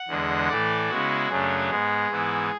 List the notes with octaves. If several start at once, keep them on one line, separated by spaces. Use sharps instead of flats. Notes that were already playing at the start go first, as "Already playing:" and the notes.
Already playing: F#5
E2 D3 G#3
A2 E3 A3 D5
C#3 G#3 B3 E4 F#4
F#2 C#3 F#3 A3 D4 G#4
G#2 G#3 B3
G#2 E3 B3 E4